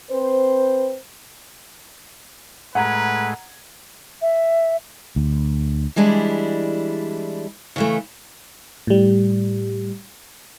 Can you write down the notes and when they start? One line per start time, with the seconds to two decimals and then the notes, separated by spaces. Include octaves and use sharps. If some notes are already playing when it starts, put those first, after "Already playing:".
0.11 C4 B4 C5
2.75 A2 G#3 B4 F#5 A#5 G#6
4.21 E5
5.16 D2
5.96 E3 G3 G#3 D4 E4
7.76 C#3 E3 A3
8.87 A2 G3